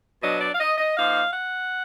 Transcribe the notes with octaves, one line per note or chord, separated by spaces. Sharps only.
B2 F#3 D4 D#5
D5
F5
D#5
D#5
F3 A#3 D#4 F5
F#5